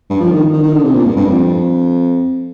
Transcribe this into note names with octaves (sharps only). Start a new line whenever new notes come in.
G2
F3
D#3
D#3
D#3
D3
C3
A#2
G2
G2
F2